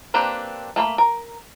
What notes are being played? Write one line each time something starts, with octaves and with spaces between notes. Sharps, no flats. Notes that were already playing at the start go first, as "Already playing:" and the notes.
A#3 C4 D4 G4 B4
A3 A#3 C5 B5
A#4